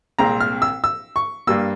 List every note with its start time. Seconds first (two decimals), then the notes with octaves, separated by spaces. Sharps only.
0.19 C2 A#2 G#3 C4 A#5
0.41 F6
0.62 E6
0.84 E6
1.16 C#6
1.47 G2 G3 A#3 E6